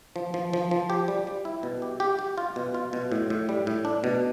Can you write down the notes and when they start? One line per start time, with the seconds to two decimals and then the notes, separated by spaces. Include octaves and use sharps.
0.16 F3
0.34 F3
0.53 F3
0.71 F3
0.90 G4
1.08 G3
1.27 G3
1.45 E4
1.63 B2
1.82 G4
2.00 G4
2.19 G4
2.38 F4
2.56 B2
2.74 F4
2.93 B2
3.12 A2
3.30 A2
3.49 G3
3.67 A2
3.85 D4
4.04 B2